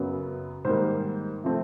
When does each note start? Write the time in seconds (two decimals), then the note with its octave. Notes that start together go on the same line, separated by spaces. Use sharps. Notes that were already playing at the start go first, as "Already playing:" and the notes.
Already playing: F#2 C#3 F#3 B3
0.65 G#2 D#3 G3 A#3 C5
1.44 C3 F3 A3 C4